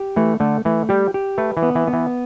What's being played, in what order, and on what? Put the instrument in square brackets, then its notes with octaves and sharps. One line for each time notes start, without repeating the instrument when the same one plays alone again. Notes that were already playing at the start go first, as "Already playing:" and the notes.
Already playing: [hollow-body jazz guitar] G4
[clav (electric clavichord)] E3 [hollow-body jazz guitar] A3
[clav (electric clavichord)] D3 [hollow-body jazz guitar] A3
[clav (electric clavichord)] E3 [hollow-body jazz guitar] A3
[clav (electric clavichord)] G3 [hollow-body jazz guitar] G4
[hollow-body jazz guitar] G4
[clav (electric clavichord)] A3 [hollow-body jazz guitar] B4
[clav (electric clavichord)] E3
[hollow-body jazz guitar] B3
[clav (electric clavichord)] E3
[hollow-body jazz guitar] B3
[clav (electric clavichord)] E3